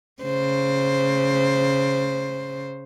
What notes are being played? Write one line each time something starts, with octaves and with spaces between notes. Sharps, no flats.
C#3 C5